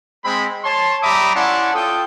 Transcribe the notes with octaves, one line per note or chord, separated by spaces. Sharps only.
G#3 C4 B5
C#5 A5 C6
G3 E5 A#5 B5 D6 D#6
C#4 E4 D5 F#5 A5 C6
F4 A4 G5 D#6